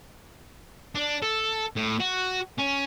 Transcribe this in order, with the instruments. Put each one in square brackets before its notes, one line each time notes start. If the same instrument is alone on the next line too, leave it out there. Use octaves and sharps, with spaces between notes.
[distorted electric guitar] D4
A4
A2
F#4
C#4